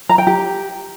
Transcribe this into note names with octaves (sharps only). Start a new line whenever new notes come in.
A#5
G5
G4